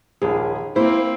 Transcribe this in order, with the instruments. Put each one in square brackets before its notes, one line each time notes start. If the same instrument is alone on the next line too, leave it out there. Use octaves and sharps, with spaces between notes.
[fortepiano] A#1 G#4 [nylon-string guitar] D#2
[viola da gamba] A#3 C4 [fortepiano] E4 [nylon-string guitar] C5